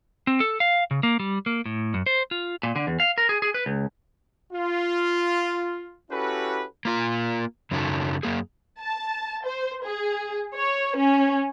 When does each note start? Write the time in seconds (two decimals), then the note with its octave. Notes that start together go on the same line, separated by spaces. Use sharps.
0.27 C4
0.40 A4
0.60 F5
0.91 C#3
1.03 A#3
1.20 G3
1.46 A#3
1.66 A2
1.94 F#2
2.06 C5
2.31 F4
2.63 A#2
2.76 D3
2.87 E2
3.00 F5
3.18 A#4
3.29 G#4
3.42 G#4
3.54 B4
3.66 C#2
4.53 F4
6.11 C#4 E4 F#4 G4 A4 B4
6.85 A#3 F4 A#4
7.71 F#2 C#3 F#3 D#4 F4 A4
8.23 F#2 A#3 G#4
8.79 A5
9.45 C5
9.84 G#4
10.55 C#5
10.98 C#4